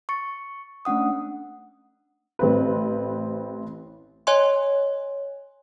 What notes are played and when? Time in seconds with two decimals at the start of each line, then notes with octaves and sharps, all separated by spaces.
0.09 C#6 A6 C#7
0.85 A3 C#4 D4 F#5 D#6
2.39 A1 C4 B4
4.27 C#5 D#5 G#5 C6